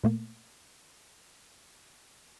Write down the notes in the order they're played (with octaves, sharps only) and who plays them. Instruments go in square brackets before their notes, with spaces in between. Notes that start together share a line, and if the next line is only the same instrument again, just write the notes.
[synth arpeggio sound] A#2 A3 A#3